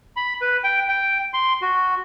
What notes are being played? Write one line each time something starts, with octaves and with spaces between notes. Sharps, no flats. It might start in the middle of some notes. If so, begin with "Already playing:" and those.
B5
B4
G5
G5
C6
F#4